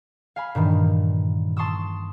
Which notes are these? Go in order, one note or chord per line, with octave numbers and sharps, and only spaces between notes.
F5 G#5 B5
G2 A#2 D#3 E3 G3
A5 C6 C#6 D#6 E6